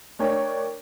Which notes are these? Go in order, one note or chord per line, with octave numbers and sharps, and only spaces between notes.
A3 D4 A#4 C#5 G5